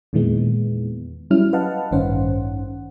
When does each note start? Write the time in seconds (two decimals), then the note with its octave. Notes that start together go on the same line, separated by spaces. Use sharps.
0.13 E2 A#2 D#3 E3 G#3 B3
1.30 F#3 G3 C#4 E4 F6
1.53 B4 D#5 F5 F#5 A5
1.91 A1 G2 D#3 C#4 C5 F#5